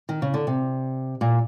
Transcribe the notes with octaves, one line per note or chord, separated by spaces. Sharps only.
D#3
C#3
D3
C3
A#2